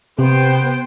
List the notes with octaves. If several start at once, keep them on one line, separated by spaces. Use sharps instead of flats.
C3 B3 C5 G5